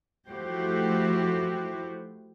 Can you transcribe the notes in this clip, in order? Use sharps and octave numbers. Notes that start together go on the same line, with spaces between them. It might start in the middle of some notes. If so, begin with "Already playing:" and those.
F3 A3 E4 F#4 G4 C5